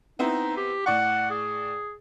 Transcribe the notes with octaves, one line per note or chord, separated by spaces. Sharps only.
B3 C4 D#4 E4
G4
A2 D5 F#5 C#6
G#4